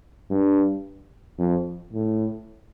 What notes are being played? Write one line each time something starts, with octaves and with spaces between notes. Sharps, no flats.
G2
F2
A2